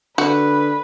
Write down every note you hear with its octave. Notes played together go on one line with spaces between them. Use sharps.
D3 F#4 B4